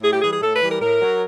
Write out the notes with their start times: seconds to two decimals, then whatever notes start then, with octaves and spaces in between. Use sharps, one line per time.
0.01 A2 G#4
0.12 G4
0.21 E3 G3 G#4
0.32 G#4
0.41 A2 A4
0.54 B4
0.61 E3 G3
0.68 A#4
0.80 A2 A#4
1.01 F#3